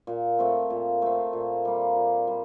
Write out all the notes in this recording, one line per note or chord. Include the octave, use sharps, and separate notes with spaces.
A#2
A3 C4
A#2
A3 C4
A#2
G3 A#3
A#2
G3